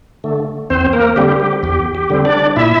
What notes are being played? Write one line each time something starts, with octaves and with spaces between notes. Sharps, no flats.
D3 A3
E2 C4 C5
A#3 A#4
D3 G3 C4 G4
G4
E2 G4
G4
D3 G3 C4
D4 D5
A#2 E4 E5